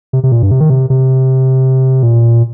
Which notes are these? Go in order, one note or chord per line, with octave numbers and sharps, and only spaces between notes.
C3
C3
A#2
G2
C3
D#3
C3
C3
A#2